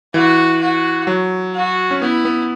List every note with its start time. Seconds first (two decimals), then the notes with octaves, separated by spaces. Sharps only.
0.14 E3 F#4
0.61 F#4
1.07 F#3
1.55 F#4
1.91 C#4
2.01 B3 E4
2.25 B3